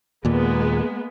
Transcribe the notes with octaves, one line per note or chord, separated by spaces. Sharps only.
D#2 A#2 G#3 A#3 B3